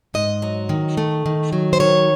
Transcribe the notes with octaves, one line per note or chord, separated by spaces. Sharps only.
G#2 D#5
F#3
D#3
A3
D#3
F#3
C5
D#3 C#5